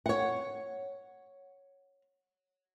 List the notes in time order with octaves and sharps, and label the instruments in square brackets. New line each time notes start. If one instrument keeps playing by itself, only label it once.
[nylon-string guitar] C#5 F#5